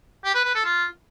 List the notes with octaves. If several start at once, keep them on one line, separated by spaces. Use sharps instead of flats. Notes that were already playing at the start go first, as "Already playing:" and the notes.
G4
B4
B4
A4
F4